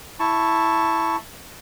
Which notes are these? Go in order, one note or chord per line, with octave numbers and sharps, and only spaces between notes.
E4 A5 C#6